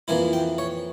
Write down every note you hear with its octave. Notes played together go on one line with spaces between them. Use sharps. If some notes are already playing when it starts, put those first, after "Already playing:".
F2 E3 A#3 E4 G#5
G5
C#5